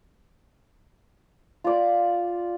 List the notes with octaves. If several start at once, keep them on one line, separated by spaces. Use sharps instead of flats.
F4 D5